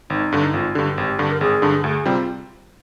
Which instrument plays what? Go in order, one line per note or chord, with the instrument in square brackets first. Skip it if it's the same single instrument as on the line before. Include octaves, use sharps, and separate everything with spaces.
[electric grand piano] G#1 [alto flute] D#4
[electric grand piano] G2 D3 [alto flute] D4
[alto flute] D#4
[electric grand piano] G#1 [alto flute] F4
[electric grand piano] G2 D3 [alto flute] G4
[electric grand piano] G#1 [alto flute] G4
[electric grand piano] G2 D3
[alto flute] A#4
[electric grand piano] G#1 [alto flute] G#4
[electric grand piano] G2 D3
[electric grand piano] D2 [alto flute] G#4
[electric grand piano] C3 G3 C4 [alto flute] F4